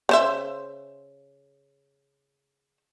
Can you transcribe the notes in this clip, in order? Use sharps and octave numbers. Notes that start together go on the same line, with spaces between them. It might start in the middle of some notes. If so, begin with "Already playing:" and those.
C#3 C5 E5